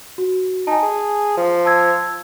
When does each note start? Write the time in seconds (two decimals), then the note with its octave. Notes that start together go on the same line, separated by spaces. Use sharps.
0.18 F#4
0.67 D#4 G#5 A5
0.83 G#4
1.37 F3
1.65 A5 E6 G#6